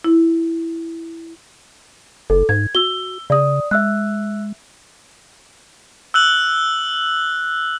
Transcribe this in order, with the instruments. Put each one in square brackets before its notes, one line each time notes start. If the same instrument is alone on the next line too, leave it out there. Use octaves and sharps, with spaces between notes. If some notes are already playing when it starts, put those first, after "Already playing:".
[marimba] E4
[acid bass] F#1 [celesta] A4
[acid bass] G#2 [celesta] G#6
[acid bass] F#4 [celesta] E6 G7
[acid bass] C#3 [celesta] D5 D#6
[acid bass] G#3 [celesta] E5 E6 F#6
[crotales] E6 F#6 F#7